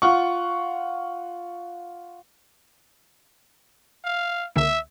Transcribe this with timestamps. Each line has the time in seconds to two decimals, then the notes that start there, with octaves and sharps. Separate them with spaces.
0.02 F4 F#5 C#6
4.05 F5
4.56 C#2 D3 A#3 E5